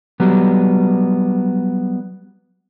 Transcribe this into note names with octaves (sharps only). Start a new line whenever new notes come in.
F#3 G3 B3